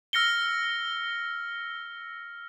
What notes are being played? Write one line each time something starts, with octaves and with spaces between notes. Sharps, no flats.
E6 F6 A#6 C#7 G7